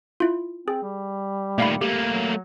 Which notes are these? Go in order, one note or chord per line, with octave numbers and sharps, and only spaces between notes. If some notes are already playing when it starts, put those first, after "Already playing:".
E4 F4
C4 G#4
G3
A#2 D#3 A3 F5 B5
A3 A#3 G4
F#3